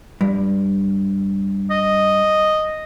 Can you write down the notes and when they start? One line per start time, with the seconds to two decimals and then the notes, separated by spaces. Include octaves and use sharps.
0.21 G2
1.70 D#5